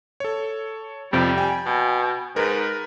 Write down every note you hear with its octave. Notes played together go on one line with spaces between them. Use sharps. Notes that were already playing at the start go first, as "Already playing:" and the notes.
A4 C#5
F2 C3 F3 G3
G5 G#5
B2
G#2 A#4 B4